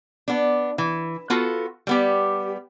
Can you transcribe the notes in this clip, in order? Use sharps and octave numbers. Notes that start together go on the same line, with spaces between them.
B3 D4
E3
B3 F4 F#4 A4
G3 B3 G4